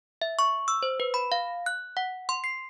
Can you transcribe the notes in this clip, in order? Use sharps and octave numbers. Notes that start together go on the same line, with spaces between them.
E5
C#6
E6
C5
B4
B5
F5
F#6
F#5
C6
C7